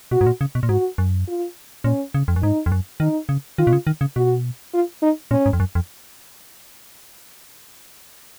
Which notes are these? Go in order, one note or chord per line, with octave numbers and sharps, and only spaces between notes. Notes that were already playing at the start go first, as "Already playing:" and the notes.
B2 F#4
G#2
A#2
C#3
B2
A#2
G#2 F#4
F#2
F4
A#2 C#4
C#3
F2
F#2
G#2 D#4
F2
F#2
D#3 D#4
C#3
D#3 F4
B2
C#3
D#3
C#3
B2 F#4
F4
D#4
A#2 C#4
G#2
F2
F#2
F2